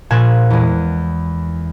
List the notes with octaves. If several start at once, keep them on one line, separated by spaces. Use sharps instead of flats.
A#1 A#2 G#5 F#6 E7
E2 G#3